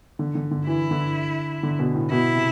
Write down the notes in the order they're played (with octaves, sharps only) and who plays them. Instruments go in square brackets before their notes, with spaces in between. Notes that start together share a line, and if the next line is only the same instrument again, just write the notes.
[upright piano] D3
D3
D3
[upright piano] E3 [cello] E4
[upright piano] D3
D3
B2
A2
[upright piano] B2 [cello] E4
[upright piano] C3